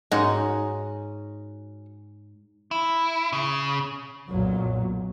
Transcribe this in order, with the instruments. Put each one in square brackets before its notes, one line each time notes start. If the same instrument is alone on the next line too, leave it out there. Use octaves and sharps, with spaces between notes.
[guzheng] G#2 [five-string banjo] C#4 F#4 D#5
[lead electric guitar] E4
C#3
[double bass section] B1 F#2 A#2 F#3